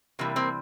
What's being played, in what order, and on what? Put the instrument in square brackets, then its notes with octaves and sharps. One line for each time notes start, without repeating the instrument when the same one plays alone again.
[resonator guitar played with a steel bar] C3 E3 G3 A#3
A#3 C4